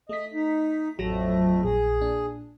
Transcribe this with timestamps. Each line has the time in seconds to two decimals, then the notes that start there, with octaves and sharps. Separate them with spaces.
0.09 A3 D#5 B6
0.34 D#4
0.98 A1 F2 F#3 A3 A#6
1.63 A#1 G#4
2.01 A#2 D4